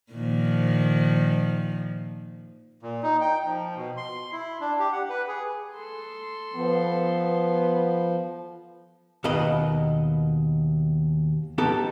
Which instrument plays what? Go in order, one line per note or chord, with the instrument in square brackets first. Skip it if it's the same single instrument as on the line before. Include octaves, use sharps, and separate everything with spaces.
[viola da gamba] A#2 D#3 F3
[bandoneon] A#2
D#4
G5
F3
B2
C6
E4
D4
G4
F#5
B4
G#4
[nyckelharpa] A4 C6
[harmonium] F3 [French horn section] B3
[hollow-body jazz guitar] D#2 B2 B3 A#4 D#5 B5
B3 D#4 G4 A4